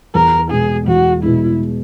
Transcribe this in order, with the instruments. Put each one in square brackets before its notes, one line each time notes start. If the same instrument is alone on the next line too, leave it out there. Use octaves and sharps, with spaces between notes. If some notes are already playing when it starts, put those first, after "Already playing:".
[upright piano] E2 [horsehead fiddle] A#4
[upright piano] B2 G#3 [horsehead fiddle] G#4
[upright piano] E2 [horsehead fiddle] F#4
[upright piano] B2 G#3 [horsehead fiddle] E4